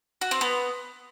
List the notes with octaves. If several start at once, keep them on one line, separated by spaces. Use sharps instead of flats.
F#4
C4
B3